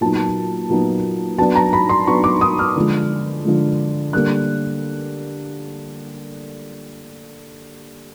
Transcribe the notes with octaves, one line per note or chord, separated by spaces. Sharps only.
A#2 F#3 B3 D#4 A5
A#2 F#3 B3 D#4
F#3 B3 D4 A5
A#5
B5
C6
F#3 B3 D4 C#6
D6
D#6
F6
D3 F3 G#3
D3 F3 G#3
D3 G3 A#3 F#6